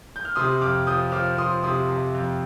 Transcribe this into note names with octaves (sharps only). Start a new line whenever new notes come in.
G6
F6
C3 C6 D#6
F2 D6 F6
F3 D#6 G6
F3 D6 F6
F3 C6 D#6
C3 C6 D#6
C3
F2